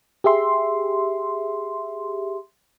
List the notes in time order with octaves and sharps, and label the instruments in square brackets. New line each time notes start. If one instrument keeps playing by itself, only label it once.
[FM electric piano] G4 G#4 E5 C6